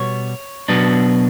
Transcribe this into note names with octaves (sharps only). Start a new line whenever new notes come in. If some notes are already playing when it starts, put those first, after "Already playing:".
Already playing: B2 G3 B3 C#5
B2 F#3 B3 D4